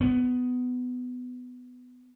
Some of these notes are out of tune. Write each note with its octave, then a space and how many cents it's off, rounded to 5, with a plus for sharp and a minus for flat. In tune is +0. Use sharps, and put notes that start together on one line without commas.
B3 +15